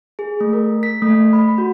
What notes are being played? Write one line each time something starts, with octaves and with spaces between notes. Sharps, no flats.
G#4
A3
A#4
B6
A3
B5
F#4